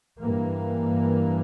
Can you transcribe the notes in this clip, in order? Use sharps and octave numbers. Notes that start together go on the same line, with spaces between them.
G2 E3 A#3